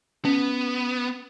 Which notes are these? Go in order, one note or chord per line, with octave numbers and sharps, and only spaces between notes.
B3 C#4